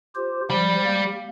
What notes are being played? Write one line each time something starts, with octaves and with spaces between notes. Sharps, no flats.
F4 G4 C5
F3 G3 B5
A#3